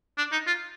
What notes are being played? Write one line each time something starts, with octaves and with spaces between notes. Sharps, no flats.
D4
D#4
F4